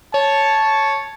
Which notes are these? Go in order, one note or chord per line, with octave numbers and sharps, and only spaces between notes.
C#5 A5